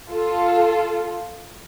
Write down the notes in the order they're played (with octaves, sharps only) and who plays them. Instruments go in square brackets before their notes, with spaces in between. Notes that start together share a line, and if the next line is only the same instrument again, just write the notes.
[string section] F4 A4